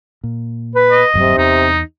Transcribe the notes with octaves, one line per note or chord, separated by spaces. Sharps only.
A#2
B4
D#5
D#1 G2 C3 F#3
E2 D#4